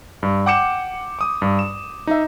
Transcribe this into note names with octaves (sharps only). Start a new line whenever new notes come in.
G2
F#5 G5 D6 G6 C#7 E7
D6 D#6
G2
E7
D#4 E5